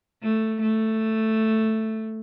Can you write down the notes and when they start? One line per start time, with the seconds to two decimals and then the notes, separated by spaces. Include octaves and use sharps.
0.23 A3
0.62 A3